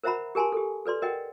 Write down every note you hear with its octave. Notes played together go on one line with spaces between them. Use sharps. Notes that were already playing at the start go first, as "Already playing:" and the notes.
A#4 C5 E5 F#5 A#5 B5
G4 A#4 G#5 A5 C6
G4 A4
A4 B4 D5 C6
A#4 D#5 F#5 G5